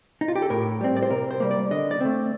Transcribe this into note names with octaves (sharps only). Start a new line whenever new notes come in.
D#4
F4
G4
A4
A2 A#4
G3 C4
D5
C5
C3 A#4
C5
G3 A#3
D5
D3 D#5
D5
A3 C4